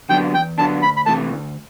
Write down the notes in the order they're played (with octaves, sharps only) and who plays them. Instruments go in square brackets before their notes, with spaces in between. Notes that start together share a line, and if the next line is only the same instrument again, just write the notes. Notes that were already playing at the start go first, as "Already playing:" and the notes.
[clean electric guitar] D3 F#3 B3 D4 [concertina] G5
[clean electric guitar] E2 [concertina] G5
[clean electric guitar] D3 F#3 B3 D4 [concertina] A5
[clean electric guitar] D2 [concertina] B5
[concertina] B5
[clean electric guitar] C3 E3 A3 [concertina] A5
[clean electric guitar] D2